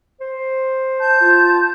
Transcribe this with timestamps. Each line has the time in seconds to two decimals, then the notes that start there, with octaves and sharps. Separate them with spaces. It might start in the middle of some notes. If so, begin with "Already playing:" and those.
0.21 C5
0.99 A5 G6
1.21 F4